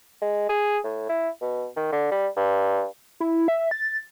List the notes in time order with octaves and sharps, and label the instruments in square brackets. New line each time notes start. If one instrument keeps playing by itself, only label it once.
[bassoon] G#3
G#4
A2
E4
B2
D#3
D3
G3
G2
[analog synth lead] E4
E5
A6